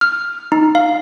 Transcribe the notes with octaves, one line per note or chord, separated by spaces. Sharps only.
F6
D#4
F5